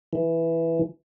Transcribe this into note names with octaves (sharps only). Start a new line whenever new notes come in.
E3